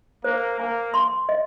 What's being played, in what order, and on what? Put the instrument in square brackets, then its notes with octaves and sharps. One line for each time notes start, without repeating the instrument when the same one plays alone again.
[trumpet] A#3 [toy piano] C5
[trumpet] A#3 [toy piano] G#5
[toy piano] C6
D#5